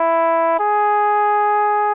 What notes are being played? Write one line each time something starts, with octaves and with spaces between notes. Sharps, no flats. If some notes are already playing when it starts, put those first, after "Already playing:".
Already playing: E4
G#4